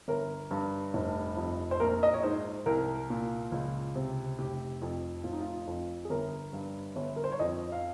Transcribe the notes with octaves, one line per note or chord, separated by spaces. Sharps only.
G1 A#4
G2
F1
F2
C5
A#1 A#4
D#5
C#5
G#2 C5
C2 A#4
A#2
C#2
C3
F1 G4
F2
F1 F4
D#4
F4
F2
G#4
G1 A#4
G2
G1
A#4
C5
C#5
F2 D#5
F5